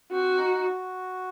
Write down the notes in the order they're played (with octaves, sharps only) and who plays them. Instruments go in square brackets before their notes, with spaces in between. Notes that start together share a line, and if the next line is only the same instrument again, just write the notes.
[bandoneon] C4 [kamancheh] F#4
[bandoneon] D#4
F#4